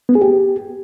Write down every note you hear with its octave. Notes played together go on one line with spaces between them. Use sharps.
B3
G#4
G4